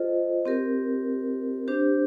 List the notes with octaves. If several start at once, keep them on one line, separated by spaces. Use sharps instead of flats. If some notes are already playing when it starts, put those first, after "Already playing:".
Already playing: F4 A4 C5 D#5
C4 G4 A#4
D4 G4 C5